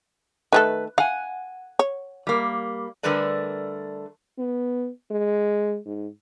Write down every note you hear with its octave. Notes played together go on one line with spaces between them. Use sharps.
D#3 A3 A4 B4
F5 F#5 G#5
C#5
G3 A#3
D3 G3 A3 A#4 B4 D5
B3
G#3
G#2